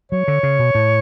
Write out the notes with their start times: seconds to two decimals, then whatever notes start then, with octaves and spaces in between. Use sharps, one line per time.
0.12 F#3 C#5
0.28 D3
0.43 C#3
0.59 B2
0.75 A2